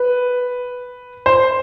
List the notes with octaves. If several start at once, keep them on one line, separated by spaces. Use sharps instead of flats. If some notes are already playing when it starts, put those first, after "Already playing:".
Already playing: B4
C5